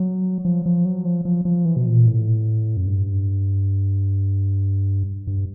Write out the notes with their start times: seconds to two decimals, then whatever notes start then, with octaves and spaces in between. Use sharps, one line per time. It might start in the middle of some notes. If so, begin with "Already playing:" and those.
Already playing: F#3
0.45 F3
0.66 F3
0.85 F#3
1.05 F3
1.25 F3
1.45 F3
1.65 E3
1.76 B2
1.86 A#2
2.06 A2
2.77 F#2
2.86 G2
5.27 G2